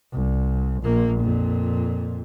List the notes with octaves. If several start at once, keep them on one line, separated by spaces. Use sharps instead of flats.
C2
A#1 A#3
F2 A#2